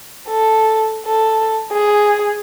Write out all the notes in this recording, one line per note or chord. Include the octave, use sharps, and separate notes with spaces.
A4
A4
G#4